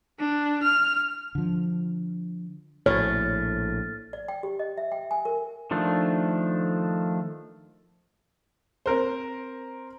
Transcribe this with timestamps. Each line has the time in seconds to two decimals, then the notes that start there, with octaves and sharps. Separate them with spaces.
0.19 D4
0.63 F6
1.35 D3 F3
2.86 A#1 A2 C#5 F6 A6
4.13 D5
4.28 G5
4.43 G4
4.59 D#5
4.77 E5
4.92 G5
5.11 G#5
5.25 A#4
5.71 D#3 F3 A3 D4
8.86 C4 A#4 C5